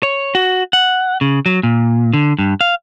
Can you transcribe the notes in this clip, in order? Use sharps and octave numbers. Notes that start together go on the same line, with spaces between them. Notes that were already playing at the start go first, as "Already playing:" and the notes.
C#5
F#4
F#5
C#3
F#3
A#2
D3
G2
F5